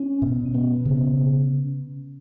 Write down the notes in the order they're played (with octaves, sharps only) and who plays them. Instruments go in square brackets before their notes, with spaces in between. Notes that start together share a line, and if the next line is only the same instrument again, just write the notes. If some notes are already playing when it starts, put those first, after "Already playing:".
Already playing: [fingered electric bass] C#4
B2
B3
C#3